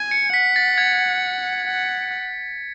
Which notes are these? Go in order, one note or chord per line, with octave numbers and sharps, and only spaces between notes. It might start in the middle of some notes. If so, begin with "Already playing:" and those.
Already playing: G#5
C#7
F#5 B6
A6
G#6
F#5